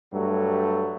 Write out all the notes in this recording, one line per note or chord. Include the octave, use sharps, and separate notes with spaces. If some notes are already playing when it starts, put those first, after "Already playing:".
G2 F#3 A3